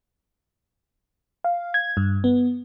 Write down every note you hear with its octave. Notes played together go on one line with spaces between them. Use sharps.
F5
G#6
G2
B3